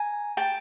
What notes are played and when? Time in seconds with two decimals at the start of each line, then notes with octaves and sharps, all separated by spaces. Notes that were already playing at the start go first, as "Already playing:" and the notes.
Already playing: G#5 A#5
0.37 G5 A5